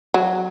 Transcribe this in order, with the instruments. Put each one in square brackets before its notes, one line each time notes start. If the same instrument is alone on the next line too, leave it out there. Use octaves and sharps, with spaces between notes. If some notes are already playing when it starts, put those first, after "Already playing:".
[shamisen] F#3